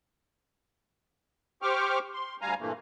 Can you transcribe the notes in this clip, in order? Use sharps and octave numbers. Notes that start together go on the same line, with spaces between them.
G4 C5 G5 C#6 D6 F6
C6
D2 G3 F5 G#5 A#5
G2 A#2 E3 A3 A#3